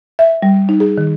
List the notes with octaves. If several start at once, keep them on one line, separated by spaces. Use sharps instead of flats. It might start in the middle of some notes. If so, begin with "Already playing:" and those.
E5
G3
D#4
G#4
D#3